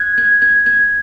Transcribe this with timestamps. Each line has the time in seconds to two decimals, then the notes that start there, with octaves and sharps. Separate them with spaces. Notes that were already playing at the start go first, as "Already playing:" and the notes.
Already playing: F#6 G#6
0.18 G#6
0.42 G#6
0.66 G#6